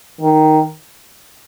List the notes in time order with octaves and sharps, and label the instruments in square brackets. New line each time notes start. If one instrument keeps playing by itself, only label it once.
[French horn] D#3